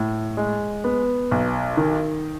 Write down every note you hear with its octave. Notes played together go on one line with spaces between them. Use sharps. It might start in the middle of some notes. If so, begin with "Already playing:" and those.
Already playing: A2
G#3
B3
B1
D#3